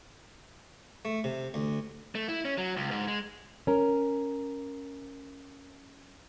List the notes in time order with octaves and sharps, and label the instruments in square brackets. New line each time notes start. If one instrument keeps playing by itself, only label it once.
[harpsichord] A3
C3
D2
[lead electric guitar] A3
E4
C#4
F#3
C#2
G#2
G#3
[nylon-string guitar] C#4 A#4